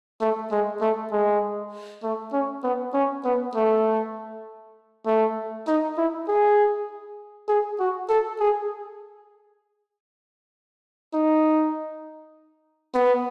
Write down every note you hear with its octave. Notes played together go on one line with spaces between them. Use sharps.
A3
G#3
A3
G#3
A3
C#4
B3
C#4
B3
A3
A3
D#4
E4
G#4
G#4
F#4
A4
G#4
D#4
B3